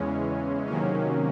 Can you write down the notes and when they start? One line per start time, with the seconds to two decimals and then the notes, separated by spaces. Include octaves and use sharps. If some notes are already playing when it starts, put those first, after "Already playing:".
Already playing: E2 C#3 E3 G#3 C#4
0.67 C3 D#3 F#3 A#3 C#4